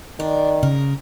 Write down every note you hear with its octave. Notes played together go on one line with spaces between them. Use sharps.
D#3 D4
C#3 A#4